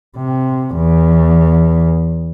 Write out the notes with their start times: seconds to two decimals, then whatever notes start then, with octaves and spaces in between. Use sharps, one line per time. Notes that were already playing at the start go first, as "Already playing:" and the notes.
0.17 C3
0.76 E2